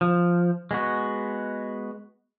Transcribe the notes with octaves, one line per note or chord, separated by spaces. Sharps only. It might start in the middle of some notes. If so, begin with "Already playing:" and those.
F3
G#3 B3 F#4